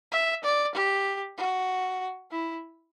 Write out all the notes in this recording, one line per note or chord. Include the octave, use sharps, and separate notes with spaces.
E5
D5
G4
F#4
E4